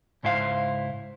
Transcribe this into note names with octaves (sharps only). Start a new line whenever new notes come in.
C#2 G#2 E4 C5 F5